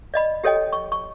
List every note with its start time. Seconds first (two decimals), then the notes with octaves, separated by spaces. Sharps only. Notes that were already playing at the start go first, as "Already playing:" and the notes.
0.14 D5 D#5 B5
0.44 G4 A4 C#5 D#5 G5
0.73 C#6
0.92 C#6